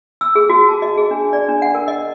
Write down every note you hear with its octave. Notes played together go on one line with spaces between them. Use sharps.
E6
G#4
F#4
A5
D#5
G#4
D4
D5
D4
F#5
A#4
D#5